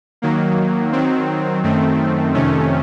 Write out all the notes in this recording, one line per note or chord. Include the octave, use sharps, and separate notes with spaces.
D#3 F#3 A#3
D#3 F#3 C4
F#2 D#3 A3 C4
F2 C3 D#3 A3 C#4